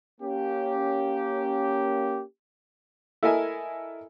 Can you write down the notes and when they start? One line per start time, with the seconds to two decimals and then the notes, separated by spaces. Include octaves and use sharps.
0.21 A#3 C#4 G4
3.23 E4 A4 A#4 D#5 E5 G#5